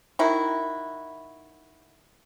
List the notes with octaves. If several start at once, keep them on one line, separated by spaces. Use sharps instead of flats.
D#3 E4 F#4